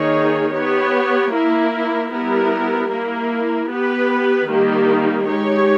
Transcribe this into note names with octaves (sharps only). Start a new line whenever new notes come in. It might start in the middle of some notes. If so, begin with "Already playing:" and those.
Already playing: D#3 A#3 D#4 G#4 C#5
B3 G4 C#5
A#3 E4 A#4
G3 B3 E4 A#4
A#3 E4 A#4
B3 G4 B4
D#3 G3 A#3 D#4 G4
G#3 D#4 G4 C#5